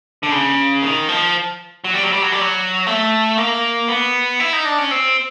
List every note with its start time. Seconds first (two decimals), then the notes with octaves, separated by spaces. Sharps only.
0.23 D3
0.32 C#3
0.82 D#3
1.08 F3
1.84 F#3
1.94 G3
2.03 F#3
2.13 G3
2.22 F#3
2.32 G3
2.41 F#3
2.87 A3
3.38 A#3
3.88 B3
4.40 E4
4.53 D#4
4.65 D4
4.78 C#4
4.91 C4